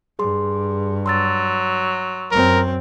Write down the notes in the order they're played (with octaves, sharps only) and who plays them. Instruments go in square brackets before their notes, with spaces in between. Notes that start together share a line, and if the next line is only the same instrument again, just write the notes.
[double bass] G2 [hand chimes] G#4 C6
[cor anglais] F#3 [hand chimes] C6 E6 A6
[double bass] F#2 C4 [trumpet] A#4